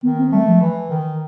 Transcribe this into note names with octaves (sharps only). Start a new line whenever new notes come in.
D#3 B3
C4
G3 A3
F3
E3
D#3